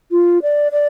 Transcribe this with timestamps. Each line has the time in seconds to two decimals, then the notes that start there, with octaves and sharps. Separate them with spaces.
0.12 F4
0.42 D5
0.72 D5